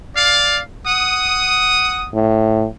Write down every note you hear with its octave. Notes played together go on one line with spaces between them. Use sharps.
D5 F5
F#5 D#6
A2